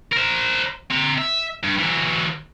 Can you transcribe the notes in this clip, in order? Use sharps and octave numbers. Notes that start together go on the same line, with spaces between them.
A#4 C5
C4 A#5
E5
G2
E3 F#3